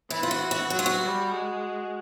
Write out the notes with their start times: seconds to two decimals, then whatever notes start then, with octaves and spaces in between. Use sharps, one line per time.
0.10 E3 E4
0.23 F4
0.31 F#4
0.51 F#4
0.70 F#3 F#4
0.79 F4
0.86 F#4
1.01 G3
1.31 G#3